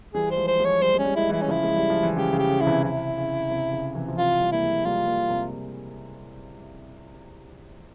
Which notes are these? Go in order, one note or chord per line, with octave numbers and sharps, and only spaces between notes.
E3 G3 G#4
C5
F3 G#3
C5
F3 G#3
C#5
G3 C5
G#3
C#4
G3
G#3 E4
E3 G3 E4
C#4
C#3 F3 E4
G#3
G3
F3
E3
C#3 G4
C#3
G4
C#3
E4
C3 E3
C3 E4
C#3
C3
C#3
C3 E3
F3
C3 E3 F4
E3 G3
A#3 E4
F3 G#3
G3 A#3 F4
G3 A#3
C3